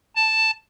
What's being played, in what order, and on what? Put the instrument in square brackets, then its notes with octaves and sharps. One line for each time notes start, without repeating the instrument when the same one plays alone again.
[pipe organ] A5